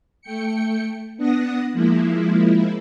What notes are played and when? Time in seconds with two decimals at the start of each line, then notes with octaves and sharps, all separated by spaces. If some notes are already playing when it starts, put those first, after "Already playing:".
0.22 A3 G5 C#7
1.17 B3 D4 F#5 D#6 A#6
1.73 F3 G#3 A#3 E4